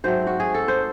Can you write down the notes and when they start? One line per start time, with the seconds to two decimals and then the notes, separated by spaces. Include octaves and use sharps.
0.04 G#2 F#3 A3 C4 C5
0.27 F#4
0.40 G#4
0.54 A4
0.68 C5